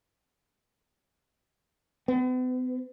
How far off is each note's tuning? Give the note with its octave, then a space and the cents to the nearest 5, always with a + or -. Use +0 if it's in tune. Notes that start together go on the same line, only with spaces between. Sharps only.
B3 +45